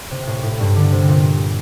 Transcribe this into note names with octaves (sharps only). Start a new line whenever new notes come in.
C3
A2
A2
G2
D3
C3
A#2